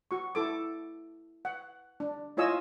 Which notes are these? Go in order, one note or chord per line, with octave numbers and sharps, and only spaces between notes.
F#4 C#6
E4 A4 D6
F#5
D4
E4 F4 C#5 D#5 G#5 E6